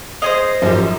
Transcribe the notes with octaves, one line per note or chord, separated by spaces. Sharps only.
G#4 C5 C#5 D#5 F5
G#1 F#2 F3 G3 C#4 G4